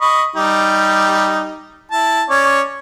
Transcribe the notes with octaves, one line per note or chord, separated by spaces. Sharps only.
D#5 B5 C#6
G3 D#4 G4
E4 A5
C#4 C#5 D5